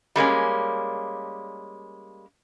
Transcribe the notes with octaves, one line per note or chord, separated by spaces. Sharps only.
G3 G#3 A#3 C#4